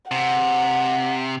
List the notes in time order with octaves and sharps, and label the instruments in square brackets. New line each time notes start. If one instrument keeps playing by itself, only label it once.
[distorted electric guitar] C3 [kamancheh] F#5